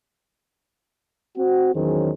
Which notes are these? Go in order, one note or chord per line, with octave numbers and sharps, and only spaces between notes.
C4 F#4
E2 D#3 F#3 C#4 G#4 C5